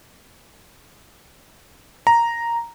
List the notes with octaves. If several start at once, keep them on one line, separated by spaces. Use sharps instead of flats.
A#5